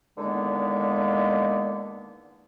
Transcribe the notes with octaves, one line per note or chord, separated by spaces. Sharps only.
E2 D3 D#3 G#3 A#3 B3